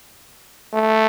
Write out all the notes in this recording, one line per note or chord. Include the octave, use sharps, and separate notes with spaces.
A3